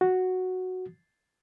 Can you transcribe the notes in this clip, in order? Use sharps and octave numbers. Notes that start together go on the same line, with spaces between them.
F#4